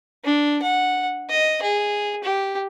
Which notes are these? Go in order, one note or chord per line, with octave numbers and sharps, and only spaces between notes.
D4
F#5
D#5
G#4
G4